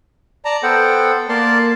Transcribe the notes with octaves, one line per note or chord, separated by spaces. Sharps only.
D5 A5 A#5
B3 A4 C5 F#5 G5
A#3 A#4 D5 A5 C6